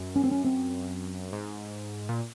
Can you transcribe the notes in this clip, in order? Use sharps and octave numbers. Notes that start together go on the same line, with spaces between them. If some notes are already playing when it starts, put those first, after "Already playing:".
Already playing: F#2
C#4
C4
C#4
C4
G#2
A#2